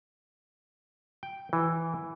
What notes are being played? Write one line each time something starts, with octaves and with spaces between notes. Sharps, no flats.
G5
E3